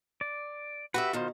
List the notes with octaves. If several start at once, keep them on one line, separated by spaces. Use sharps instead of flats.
D5
F#4 G4 B4 E5
B2 D#3 F4 C5